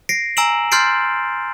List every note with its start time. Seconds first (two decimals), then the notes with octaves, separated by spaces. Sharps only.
0.09 A#6 C7 D7
0.37 G#5 A#5 E6 D7 E7 F#7
0.72 C6 F6 G6 A6 C7 D7